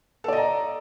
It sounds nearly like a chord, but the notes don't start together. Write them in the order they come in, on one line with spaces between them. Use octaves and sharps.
A4 D5 D#5 A#5